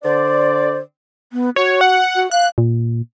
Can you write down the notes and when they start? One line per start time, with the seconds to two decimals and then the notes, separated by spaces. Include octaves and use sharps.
0.04 D3 C5 D5
1.33 B3
1.56 F#4 C#5
1.81 F#5
2.16 F#4
2.31 F5 F#6
2.58 A#2